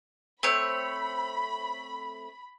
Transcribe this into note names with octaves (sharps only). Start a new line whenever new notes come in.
A3 C4 C#5 B5